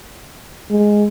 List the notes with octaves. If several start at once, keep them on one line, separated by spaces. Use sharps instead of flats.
G#3